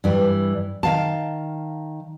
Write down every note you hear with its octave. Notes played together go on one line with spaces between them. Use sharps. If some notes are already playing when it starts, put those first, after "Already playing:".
G2 E3 G3
D#3 F5 A5